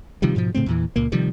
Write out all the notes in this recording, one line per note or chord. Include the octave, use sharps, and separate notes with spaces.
C3 D#3 F3 G3
G#2 B2 F3
A2 C#3 A3 C4
E2 A#2 E3
C#2 A#2 A#3
C3 D#3 F3 G3